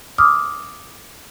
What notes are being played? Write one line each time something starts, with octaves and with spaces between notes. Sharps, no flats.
D6 D#6 F6